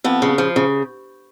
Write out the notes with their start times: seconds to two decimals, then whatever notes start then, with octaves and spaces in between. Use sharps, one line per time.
0.04 F2 B3
0.22 C#3
0.38 F3
0.56 C#3